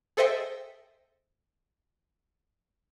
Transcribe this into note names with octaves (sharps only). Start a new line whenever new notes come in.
G#4 A4 C5 D#5 E5 G5